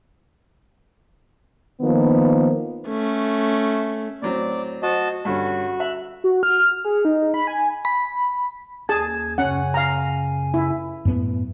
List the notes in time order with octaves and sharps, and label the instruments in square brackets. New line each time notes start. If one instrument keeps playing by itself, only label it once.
[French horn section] D#3 F3 A#3 B3
[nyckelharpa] A3 C#4
[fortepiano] A2 F#3 C4 [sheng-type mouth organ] D5
[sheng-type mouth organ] F#4 D#5 A5 [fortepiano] C5
[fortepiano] G2 D3 C#4 [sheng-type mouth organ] F#4
[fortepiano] E5 [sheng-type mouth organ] F#6
[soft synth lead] F#4
F6
G#4
D#4
B5
G#5
[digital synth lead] B5
[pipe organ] D#2 G#6 [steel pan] G#4 A5
[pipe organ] F#2 C#3 G#5 [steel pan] C#4 F#5
[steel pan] F5 A#5
E4
[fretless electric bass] F#2 A2 B3